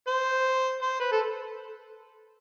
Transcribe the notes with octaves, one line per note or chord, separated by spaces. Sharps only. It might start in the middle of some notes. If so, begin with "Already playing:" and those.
C5
C5
B4
A4